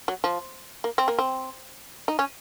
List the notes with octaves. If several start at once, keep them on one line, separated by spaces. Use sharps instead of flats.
F#3
F3
A#3
C4
A#3
C4
D#4
C#4